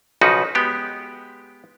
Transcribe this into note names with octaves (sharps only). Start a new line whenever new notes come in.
B1 C#3 F3 D#4 F#4 B4
G#3 B3 G4